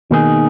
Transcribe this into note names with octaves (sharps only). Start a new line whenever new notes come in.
B2 D#3 A#3 D#4 G#4